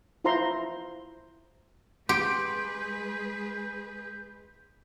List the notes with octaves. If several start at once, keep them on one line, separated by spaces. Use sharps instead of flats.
E4 F4 C5 E5 A#5 C6
G#3 G4 G#4 B4 C6 G6 D7